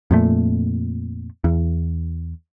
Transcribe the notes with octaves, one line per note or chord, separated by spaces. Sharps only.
F2 A#2 A3
E2